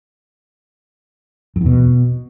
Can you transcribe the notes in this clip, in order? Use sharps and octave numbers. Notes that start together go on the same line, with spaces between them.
F2
E2
B2